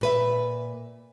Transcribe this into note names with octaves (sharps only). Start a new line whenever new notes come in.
A#2 B4 E5